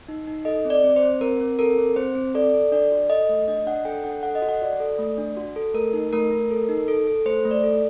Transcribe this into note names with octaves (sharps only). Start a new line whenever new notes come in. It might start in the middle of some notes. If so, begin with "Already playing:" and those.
D#4
D#4
A4 D#5
C4
D5
C4
C5
C4
C4 A#4
C4
A4 A#4
C4
C4 C5
C4
A4 D5
A4
D4 D5
F#4
A4 D#5
A3
D4 D#5
D4 F#5
A4 G5
D4 F#5
A4 F#5
D#5
F#4
F#5
F#4 D5
A4
A3
D4
F#4
A4
A3 A#4
D#4
A3 A#4
A3
A4
D#4
A4
A4
A3 C5
A3
D5
A4